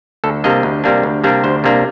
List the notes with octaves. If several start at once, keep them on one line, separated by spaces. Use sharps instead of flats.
D2 A4
C3 G3 A#3 D4 D#5
D2
C3 G3 A#3 D4
D2
C3 G3 A#3 D4
D2 C5
C3 G3 A#3 D4